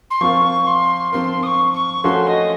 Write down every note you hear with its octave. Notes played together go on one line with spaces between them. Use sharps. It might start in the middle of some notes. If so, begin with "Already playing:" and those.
C6
F3 C4 F4 A#4 C#6
C6
F3 C4 F4 A#4 C6
D#6
C#6
C#6
F3 A3 C#4 F#4 C6
D#5